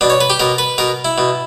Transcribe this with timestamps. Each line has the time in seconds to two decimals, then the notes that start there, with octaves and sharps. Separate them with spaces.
0.01 B2 D4
0.10 C#5
0.21 B4
0.30 G4
0.40 B2 A#4
0.58 B4
0.78 B2 A#4
1.05 E4
1.18 B2